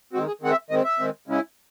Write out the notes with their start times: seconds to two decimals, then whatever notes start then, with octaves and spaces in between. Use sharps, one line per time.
0.13 D#3 G#3 C4 F#4
0.27 G#4
0.41 D#3 G#3 C4 F#5
0.51 E5
0.70 D#3 G#3 C4 D#5
0.84 E5
0.99 D#3 G#3 C4
1.28 C#3 G#3 C#4 E4